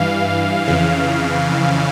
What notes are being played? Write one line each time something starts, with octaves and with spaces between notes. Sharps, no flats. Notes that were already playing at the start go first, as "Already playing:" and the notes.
Already playing: G2 E3 F5
F2 C#3 E3